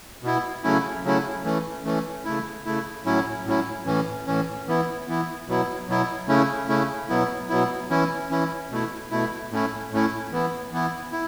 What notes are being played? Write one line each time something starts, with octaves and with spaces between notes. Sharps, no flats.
B2 B3 E4
C#3 F#3 A3 C#4 E4
C#3 F#3 A3 C#4 E4
E3 A3 C#4
E3 A3 C#4
C#3 A3 E4
C#3 A3 E4
A2 F#3 C#4 E4
A2 F#3 C#4 E4
A2 E3 C#4
A2 E3 C#4
E3 B3 E4
E3 B3 E4
B2 F#3 B3 E4
B2 F#3 B3 E4
C#3 A3 C#4 E4
C#3 A3 C#4 E4
B2 F#3 B3 E4
B2 F#3 B3 E4
E3 C#4 E4
E3 C#4 E4
B2 A3 E4
B2 A3 E4
A2 A3 C#4 E4
A2 A3 C#4 E4
E3 B3 E4
E3 B3 E4
E4